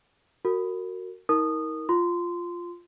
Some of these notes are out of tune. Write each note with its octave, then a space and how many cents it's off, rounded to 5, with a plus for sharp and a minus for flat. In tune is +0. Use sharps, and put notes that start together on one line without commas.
F#4 +0 A#4 -30
D#4 +40 A#4 +0 D#6 -20
F4 +0 C6 -15